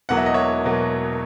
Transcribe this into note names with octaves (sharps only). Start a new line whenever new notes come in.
E1 E2 B2 F#3 A#3 F#5
E5
D#5
C#5 E5
B2 F#3 A#3